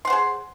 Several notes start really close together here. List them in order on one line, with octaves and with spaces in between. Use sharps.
C6 F#5 C5 G#4